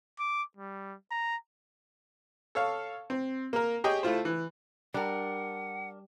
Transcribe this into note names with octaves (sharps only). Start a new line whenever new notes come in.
D6
G3
A#5
A4 C#5 F5
C4
A#3 A#4
G4 G#4 C#5 D#5 G5
A3 E4 F4 C5
E3
G3 D4 A#4 F#5